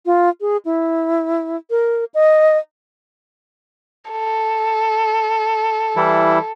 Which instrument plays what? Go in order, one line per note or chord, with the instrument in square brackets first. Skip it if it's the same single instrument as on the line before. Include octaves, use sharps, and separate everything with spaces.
[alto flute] F4
G#4
E4
A#4
D#5
[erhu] A4
[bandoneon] E3 G3 E4